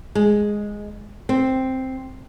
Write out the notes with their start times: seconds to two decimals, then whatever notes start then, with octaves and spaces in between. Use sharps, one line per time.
0.15 G#3
1.29 C4